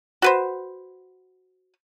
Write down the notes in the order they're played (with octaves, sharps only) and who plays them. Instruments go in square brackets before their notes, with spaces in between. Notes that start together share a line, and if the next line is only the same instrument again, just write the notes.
[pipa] F#4 B4 C5